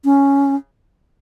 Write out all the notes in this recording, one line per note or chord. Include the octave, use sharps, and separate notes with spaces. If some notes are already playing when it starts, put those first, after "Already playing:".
C#4